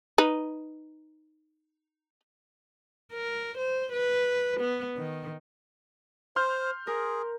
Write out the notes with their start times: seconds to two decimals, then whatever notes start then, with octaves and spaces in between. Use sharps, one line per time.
0.18 D#4 B4
3.13 A#4
3.58 C5
3.93 B4
4.60 B3
4.97 D#3
6.36 C5 C6 F6 G6
6.87 G#4 A#4